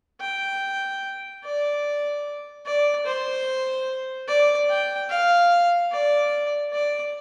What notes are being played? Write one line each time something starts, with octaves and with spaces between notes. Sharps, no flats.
G5
D5
D5
C5
D5
G5
F5
D5
D5